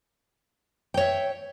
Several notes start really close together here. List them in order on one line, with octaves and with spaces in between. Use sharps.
G5 C#5 E5